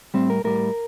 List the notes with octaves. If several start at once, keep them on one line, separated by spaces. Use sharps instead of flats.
A2 G3 C4
A#4
A2 G3 A#4